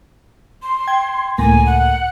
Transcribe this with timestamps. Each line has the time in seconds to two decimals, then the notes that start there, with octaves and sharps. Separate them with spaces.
0.63 C6
0.87 G5 G#6
1.38 C#2 A2 A#3 G#5
1.66 F#5